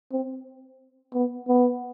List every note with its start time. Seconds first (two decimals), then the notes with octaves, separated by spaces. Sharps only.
0.12 C4
1.14 B3
1.48 B3